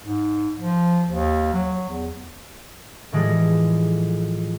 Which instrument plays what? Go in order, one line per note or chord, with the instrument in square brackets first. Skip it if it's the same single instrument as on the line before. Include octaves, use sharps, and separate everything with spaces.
[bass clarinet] G#2
F3
D#2
F#3
E2
[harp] A2 E3 F3 G3 G#3